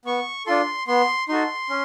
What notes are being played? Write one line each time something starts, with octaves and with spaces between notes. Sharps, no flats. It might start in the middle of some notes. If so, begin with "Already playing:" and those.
B3 C#6
D4 F4 A4 C6
B3 C6
D#4 F#4 A4 C6
C#4